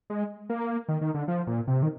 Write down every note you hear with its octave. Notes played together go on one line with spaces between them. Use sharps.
G#3
A#3
D#3
D#3
D3
F3
A#2
C3
D#3